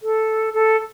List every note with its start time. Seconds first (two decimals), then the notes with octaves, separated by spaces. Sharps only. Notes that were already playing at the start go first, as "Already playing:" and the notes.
0.03 A4
0.54 A4